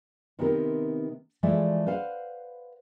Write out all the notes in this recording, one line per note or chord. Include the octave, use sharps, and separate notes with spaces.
C3 D#3 B3 C4 G4 A#4
E3 F3 G#3 A3 D5 E5
B4 C5 F5 F#5